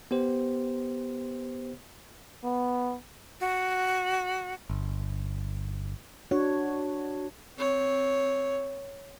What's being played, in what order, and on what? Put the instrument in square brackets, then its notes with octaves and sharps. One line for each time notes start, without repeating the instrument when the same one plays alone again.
[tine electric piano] B3 G4 C5
[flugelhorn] B3
[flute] F#4
[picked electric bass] G1
[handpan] D4 C#5 [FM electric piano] F#4
[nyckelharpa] C4 C#5